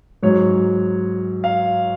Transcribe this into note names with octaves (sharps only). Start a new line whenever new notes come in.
G#2 F#3 C#5
F5